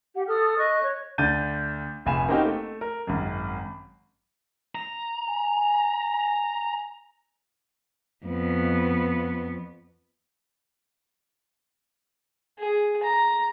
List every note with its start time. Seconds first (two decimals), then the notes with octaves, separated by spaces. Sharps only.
0.15 G4 F#5
0.27 A4 D#6 F6
0.59 D#5 C#6 F#6
0.83 C#5
1.18 D2 D4 G6 A6 D#7
2.06 F1 A#1 F5 G#5 B5 E7
2.28 A#3 C4 C#4 D#4 F#4 G4
2.45 A3
2.81 A#4
3.07 G#1 F#2
4.75 A#5
5.28 G#5
8.26 F2 B3
12.58 G#4
13.03 A#5